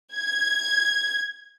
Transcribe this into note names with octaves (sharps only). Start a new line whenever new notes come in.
G#6